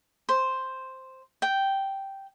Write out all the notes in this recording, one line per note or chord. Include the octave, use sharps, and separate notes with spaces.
C5
G5